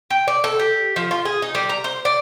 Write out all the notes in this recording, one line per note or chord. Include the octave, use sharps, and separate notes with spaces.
G5
D5
A4
G4
F3
F4
G#4
D#4
G3
A#5
C5
D5